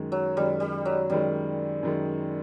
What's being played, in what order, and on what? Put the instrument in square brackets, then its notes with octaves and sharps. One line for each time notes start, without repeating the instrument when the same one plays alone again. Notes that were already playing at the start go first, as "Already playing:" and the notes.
Already playing: [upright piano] F#2 D#3 G#3
[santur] F#3
[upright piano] F#2 D#3 G#3 [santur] G3
[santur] G3
F#3
[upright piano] F#2 D#3 G#3 [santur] G3
[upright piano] F#2 D#3 G#3